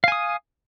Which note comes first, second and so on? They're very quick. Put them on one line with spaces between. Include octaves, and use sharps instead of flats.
F5 G#5 D#6